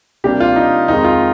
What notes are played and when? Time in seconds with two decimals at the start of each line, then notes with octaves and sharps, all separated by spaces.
0.24 C3 G3 A#3 D4 G4
0.40 F4
0.56 D#4
0.88 F2 D#3 G#3 D#4
1.04 F4